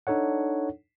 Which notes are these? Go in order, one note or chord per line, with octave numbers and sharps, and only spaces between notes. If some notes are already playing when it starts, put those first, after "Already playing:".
D4 D#4 A4 C#5 F#5